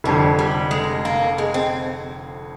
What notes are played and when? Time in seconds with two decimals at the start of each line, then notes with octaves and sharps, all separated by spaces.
0.04 F1 F2 D3 G3
0.39 G3
0.71 G#3
1.05 A#3
1.38 G#3
1.54 C4